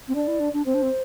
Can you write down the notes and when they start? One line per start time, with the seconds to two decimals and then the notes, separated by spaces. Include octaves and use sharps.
0.08 C4
0.15 D4 D5
0.28 E4
0.40 D4
0.53 D4
0.66 C4 C5
0.74 D4
0.82 C4